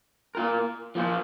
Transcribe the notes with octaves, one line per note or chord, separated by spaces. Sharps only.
A#3 F4 A#4
F3 A#3 F4 C5